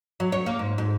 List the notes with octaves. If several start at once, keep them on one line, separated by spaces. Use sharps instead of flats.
F#3
C#5
A#3
G#2
G#2